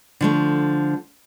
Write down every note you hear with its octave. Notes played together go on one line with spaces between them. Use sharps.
D3 F3 A3